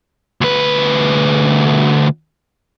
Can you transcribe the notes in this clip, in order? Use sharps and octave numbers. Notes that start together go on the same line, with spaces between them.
D2 B4